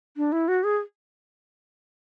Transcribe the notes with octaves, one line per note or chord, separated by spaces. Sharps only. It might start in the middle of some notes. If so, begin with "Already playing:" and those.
D4
E4
F#4
G#4